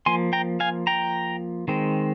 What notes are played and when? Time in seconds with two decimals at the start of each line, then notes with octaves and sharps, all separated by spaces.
0.06 F3 A#3 G#5 C6
0.33 G5 A#5
0.60 F5 G#5
0.87 G5 A#5
1.68 D#3 G#3 C4